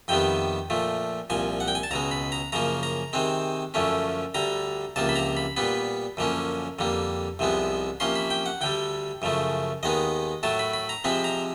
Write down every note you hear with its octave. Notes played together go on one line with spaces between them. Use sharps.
F2 C3 D#3 G3 B3 G5
A#2 F3 A3
C2 A#2 F3 G#5
F#5
G5
G#5
A5
C#2 B2 G#3 A#5
B5
A#5
F#2 C#3 F3 A#3 A#5
A#5
C3 D#3 G#3 C4
F#2 D3 F3 A3 C#4
D2 D3 G3 A#5
C#2 C3 F3 A#3 A5
B5
A#5
B5
A#2 G3 B3 B5
F#2 D3 F3 A#3 C#4
F2 D3 G3 A#3
C2 C3 F3 G#3 B3
C3 F3 A#3 C#4 C6
B5
G5
F#5
D2 D3 G3 G5
F#2 C#3 F3 A3
D#2 D#3 G#3 B3 D#5
A2 F#3 A3 A5
B5
B5
A#5
C3 F3 G#3 C4 B5
A#5